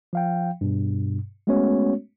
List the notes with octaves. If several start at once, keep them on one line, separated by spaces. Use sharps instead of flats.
F3 F5 G5
G2 B2
G#3 A3 B3 C#4 F#4 C#5